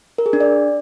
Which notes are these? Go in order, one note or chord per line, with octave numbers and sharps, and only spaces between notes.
A#4
G#4
D4
D5